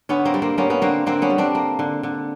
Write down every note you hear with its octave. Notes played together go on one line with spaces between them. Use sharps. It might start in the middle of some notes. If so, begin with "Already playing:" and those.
D3 B3 C#4
A#3 C4
G3
A#3 C4
A#3 B3 C#4
B3 C#4
D3 A#3 C4
D3 A#3 C4
B3 C#4
G3
C4 D4
A#3
D3
D3